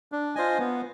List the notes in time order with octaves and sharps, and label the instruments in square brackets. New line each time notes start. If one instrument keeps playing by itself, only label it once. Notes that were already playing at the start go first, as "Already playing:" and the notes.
[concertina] D4
F4 C5 D#5 G#5
B3